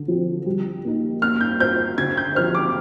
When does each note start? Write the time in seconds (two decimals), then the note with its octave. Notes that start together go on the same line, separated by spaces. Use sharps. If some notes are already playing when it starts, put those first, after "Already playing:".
Already playing: D3
0.08 F3 C4
0.46 G3
0.85 A#3 D#4
1.22 A#3 F6
1.41 G6
1.60 F4 C5 G6
1.98 D3 G#6
2.17 G6
2.35 F3 C4 G4 C5 F6
2.55 D6